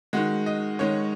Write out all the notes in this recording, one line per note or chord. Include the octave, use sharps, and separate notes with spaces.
D#3 G#3 F#4
D#5
D#3 G#3 C#5